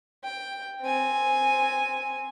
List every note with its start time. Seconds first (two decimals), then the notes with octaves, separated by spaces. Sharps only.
0.24 G5
0.81 C4 G#5